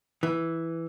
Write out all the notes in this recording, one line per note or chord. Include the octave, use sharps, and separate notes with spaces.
E3